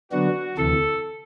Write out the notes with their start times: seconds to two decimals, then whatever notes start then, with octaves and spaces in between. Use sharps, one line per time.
0.12 D3 F#3 B3 D4 F#4
0.58 D2 C3 E3 A4